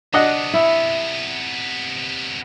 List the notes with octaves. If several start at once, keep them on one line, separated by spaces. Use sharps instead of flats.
C3 B3 D4 D#5 F#5
E4